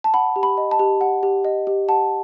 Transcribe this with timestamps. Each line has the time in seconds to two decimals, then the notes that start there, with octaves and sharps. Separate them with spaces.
0.04 A5
0.14 F#5 B5
0.36 G4
0.43 B5
0.57 D#5
0.71 A5
0.79 G4
1.01 F#5
1.23 G4
1.45 D#5
1.67 G4
1.88 F#5 A5